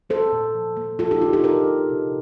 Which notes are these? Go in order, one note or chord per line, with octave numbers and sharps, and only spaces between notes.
A#3 A4 C5
A#2
F3
A#3
F3 F4 A4
D#4 G4
F3 D4 F4
D#4 G4
A#2 G4 A#4
A#2
C3